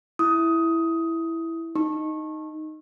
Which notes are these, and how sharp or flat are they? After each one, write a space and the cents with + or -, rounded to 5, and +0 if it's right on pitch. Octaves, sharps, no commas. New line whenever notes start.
E4 +0 D#6 +15
D#4 +0 C#6 -30